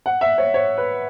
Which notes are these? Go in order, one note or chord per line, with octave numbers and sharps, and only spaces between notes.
F#5
E5
C#5
C#5
B4